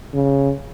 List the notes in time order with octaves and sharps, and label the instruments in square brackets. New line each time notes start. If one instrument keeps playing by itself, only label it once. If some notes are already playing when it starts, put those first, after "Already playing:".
[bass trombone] C#3